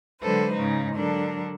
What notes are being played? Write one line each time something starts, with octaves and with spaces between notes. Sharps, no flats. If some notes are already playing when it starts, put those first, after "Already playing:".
D3 F#3 G#3 A4 B4 C5
G#2 C#3 D#4
D3 F#3 D4 A4 A#4